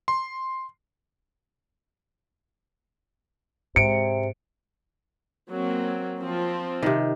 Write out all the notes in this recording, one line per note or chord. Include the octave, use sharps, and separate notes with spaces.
C6
G#2 C3 C#7 D7
F#3 A#3 C4
F3 C4
C3 D#3